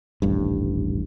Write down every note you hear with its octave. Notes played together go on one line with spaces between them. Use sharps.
D#1 A1 G2